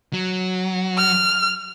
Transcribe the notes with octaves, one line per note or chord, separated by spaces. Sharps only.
F#3
F6